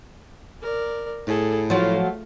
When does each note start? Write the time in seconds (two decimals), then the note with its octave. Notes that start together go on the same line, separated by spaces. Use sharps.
0.62 A#4 D5
1.27 A2 G#4 A4
1.70 F3 F#3 A3 F4